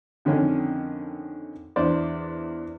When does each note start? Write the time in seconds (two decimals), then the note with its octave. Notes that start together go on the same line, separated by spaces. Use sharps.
0.25 F2 D3 D#3 C#4
1.76 E2 D4 C5 D5